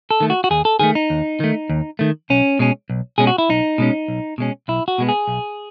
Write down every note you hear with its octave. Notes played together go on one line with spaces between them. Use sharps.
A4
D#3 A3
F#4
F#4
D#2 G#4
A4
D#3 A3 G#4
D#4
D#2
D#3 A3
D#2
D#3 A3
B1 C#4
B2 G#3 C#4
B1
B2 G#3 C#4 G#4
F#4
E4
B1 D#4
B2 G#3 C#4
B1
B2 G#3 C#4
B1 E4
F#4
B2 G#3 B3
G#4
B1